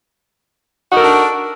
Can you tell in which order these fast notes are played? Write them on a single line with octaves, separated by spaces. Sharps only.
F#4 D#4 A#4 A4 D4